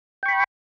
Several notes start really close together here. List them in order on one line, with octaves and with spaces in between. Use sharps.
G5 C#6 B5